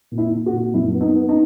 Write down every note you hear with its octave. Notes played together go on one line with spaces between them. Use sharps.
A#2
E4
A#2
F#4
A#2
F#2 E4
B3
D#4
B3
D#4